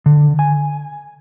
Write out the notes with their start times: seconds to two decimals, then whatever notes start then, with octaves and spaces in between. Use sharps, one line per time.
0.06 D3
0.39 G#5